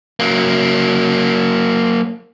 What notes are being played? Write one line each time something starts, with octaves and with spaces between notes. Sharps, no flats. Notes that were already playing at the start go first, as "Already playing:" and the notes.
F#3 A#3